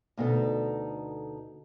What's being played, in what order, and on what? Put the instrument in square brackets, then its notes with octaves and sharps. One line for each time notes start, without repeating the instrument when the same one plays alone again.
[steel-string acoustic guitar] D2 B2 D#4 A4